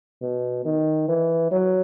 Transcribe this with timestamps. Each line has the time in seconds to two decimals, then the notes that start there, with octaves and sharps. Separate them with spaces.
0.22 B2
0.65 D#3
1.08 E3
1.51 F#3